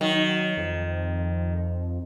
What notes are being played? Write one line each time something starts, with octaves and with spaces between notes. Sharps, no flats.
D#3 F#3
F2